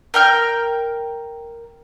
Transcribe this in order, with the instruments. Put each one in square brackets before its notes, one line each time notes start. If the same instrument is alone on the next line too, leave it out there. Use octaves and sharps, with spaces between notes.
[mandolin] A#4 G5 F6